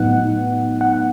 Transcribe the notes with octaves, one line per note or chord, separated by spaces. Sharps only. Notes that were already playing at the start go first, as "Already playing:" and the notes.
Already playing: A2 F#3 B3 D#4 F#5
F#5